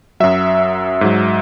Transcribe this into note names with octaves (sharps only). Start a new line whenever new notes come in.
F#2 F#3 E5
G#2 F#3